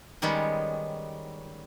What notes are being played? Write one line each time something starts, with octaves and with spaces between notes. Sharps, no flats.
D#3 G3 G#3 B3 C#4